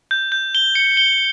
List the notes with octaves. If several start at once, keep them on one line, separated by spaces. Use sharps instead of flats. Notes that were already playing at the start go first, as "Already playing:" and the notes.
G6
G6
G7
C#7
G7